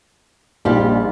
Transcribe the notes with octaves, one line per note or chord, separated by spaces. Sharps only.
A#1 G3 D#4 F4 G4